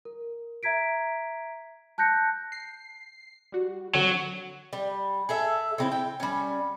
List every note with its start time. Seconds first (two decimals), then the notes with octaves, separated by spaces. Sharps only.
0.05 A#4
0.63 E5 A#5 G#6 B6 D7
1.98 A5 F#6 G6 A#6 C#7
2.52 C7
3.52 G3 F#4
3.95 D3 F#3 C4 D4
4.73 G3
5.29 G#4 A4 E5
5.78 C#3 C4 E4
5.92 G5
6.20 G3 C#4